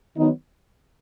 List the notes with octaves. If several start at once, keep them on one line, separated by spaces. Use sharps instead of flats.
D#3 F#3 B3 D#4